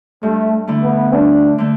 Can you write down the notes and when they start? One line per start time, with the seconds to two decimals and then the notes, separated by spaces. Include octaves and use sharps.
0.23 G2 A3
0.67 D3 A3 E4
0.83 B3
1.13 G2 D4
1.58 D3 A3